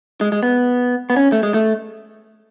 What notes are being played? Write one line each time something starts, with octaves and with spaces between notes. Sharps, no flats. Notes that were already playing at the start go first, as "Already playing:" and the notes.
G#3
G#3
B3
B3
C#4
A3
G#3
A3